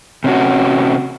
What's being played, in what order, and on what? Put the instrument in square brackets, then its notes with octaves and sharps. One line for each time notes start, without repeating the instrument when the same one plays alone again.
[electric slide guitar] C3 C#4 F#4